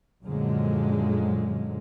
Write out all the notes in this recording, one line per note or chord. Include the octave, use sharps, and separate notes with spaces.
F#2 A#2 D3 F3 F#3 G#3